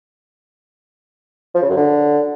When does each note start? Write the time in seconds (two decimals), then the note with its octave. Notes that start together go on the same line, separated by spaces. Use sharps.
1.55 F3
1.62 C#3
1.69 F#2
1.77 D3